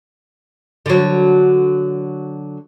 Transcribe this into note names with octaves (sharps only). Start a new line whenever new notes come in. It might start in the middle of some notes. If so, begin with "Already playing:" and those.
D3 F#3